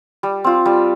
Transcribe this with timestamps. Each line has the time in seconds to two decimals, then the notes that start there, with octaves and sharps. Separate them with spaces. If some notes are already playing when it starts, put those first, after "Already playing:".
0.23 G3
0.44 C4 F4
0.66 G3